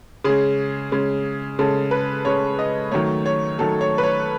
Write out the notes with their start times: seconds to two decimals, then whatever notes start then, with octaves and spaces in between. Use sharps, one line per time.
0.24 C#3 G#3 G#4
0.92 C#3 G#3
1.59 C#3 G#3 A4
1.91 B4
2.25 C#3 G#3 C#5
2.59 D#5
2.92 D#3 F#3 A3 C#5
3.26 C#5
3.59 D#3 F#3 A3 A4
3.81 C#5
3.98 B4
4.03 C#5